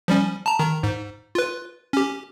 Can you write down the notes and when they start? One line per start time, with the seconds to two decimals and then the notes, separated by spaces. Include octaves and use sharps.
0.08 F3 G3 C#4
0.46 A5 A#5
0.59 D#3 A#5
0.83 G#2
1.35 F4 B4
1.93 C#4 G4